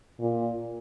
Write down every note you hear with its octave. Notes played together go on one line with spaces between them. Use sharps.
A#2